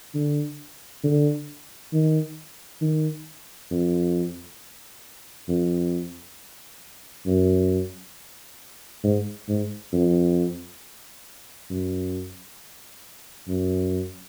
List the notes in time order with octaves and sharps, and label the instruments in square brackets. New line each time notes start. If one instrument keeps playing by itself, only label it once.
[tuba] D3
D3
D#3
D#3
F2
F2
F#2
G#2
G#2
F2
F#2
F#2